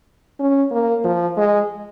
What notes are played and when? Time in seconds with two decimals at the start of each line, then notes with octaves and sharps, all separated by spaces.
0.40 C#4
0.71 A#3
1.04 F3
1.37 G#3